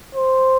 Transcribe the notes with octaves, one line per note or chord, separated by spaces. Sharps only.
C5